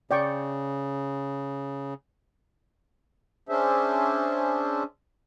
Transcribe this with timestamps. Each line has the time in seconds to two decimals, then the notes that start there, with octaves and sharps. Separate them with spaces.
0.11 C#3 D5 G5 C#6
3.49 C#4 D4 G#4 C5 E5